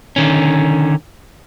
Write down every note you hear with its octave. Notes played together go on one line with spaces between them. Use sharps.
D3 D#3 C#4